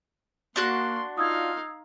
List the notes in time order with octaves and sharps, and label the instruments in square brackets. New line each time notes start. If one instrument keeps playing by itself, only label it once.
[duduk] A#3 [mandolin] D4 F#4 F#6 [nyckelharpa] C6
[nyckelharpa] D#4 F5 [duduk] F4 [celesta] D#6 E6 G#6